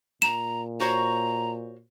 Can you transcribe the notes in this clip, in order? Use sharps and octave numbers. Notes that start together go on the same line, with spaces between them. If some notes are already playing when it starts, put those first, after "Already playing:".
A#2 A#5 E7
F#4 C5 C#5 A#5